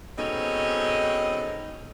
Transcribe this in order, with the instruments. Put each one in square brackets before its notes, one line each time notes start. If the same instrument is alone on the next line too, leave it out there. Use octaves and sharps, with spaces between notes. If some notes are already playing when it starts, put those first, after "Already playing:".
[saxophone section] G#2 B2 C4 C#4 D#4 A4